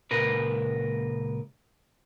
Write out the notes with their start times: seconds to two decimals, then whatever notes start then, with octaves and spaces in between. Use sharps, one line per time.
0.11 C#2 A#2 A#4 B4